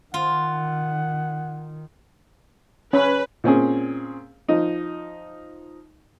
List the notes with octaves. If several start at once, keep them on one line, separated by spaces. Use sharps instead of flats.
D#3 F4 F#5
C#4 B4
A#2 C4 C#4 G#4
F3 D#4